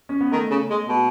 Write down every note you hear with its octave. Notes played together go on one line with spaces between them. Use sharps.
C#4
B3
D#3 A3
C#3
G#3
B2